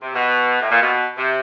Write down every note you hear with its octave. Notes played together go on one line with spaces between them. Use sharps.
C3
B2
A2
A#2
B2
C3